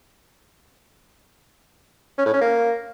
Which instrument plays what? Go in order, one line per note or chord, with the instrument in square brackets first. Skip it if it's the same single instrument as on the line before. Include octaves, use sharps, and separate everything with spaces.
[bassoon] C#4
A2
C#4
A#3